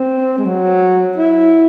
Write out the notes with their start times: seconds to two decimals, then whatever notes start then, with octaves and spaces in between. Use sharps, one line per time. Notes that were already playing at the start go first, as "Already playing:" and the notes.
Already playing: C4
0.38 G#3
0.45 F#3
1.17 E4